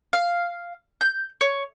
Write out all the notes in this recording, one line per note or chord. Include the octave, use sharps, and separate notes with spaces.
F5
G6
C#5